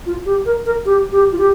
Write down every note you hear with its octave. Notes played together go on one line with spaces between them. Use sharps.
F4
G4
A#4
A#4
G4
G4
F4
G4